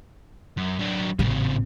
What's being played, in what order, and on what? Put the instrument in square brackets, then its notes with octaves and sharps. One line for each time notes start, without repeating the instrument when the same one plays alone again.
[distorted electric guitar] F#2
F#3 D4
[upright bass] A1 C4 [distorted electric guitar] A#2 C#3